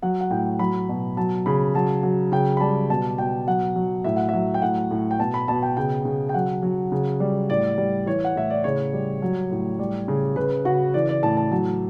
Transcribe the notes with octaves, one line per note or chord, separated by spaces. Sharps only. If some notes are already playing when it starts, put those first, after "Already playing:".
F#3 F#5
F#5
A2 G5
F#3 B5
B2
F#3 A5
C#3 B5
F#3 A5
F#3
C#3 G5
B5
G3 A5
B2 A5
B2 G5
F#3 F#5
F#3
A2 E5
F#5
F#3 E5
G5
A2 F#5
A2
G5
B2 A5
B5
B2 A5
G5
C#3 G5
C#3
G5
F#3 F#5
F#3
C#3
G3
A2 D5
G3
E3 C#5
F#5
A2 E5
D5
C#3 C#5
G3
F#3
A2
G3
C#3
C#3 B4
C#3 F#4
E3 D5
D5
A2 A5
A5
F#3 A5